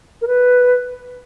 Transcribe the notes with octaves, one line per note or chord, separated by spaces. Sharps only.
A#4
B4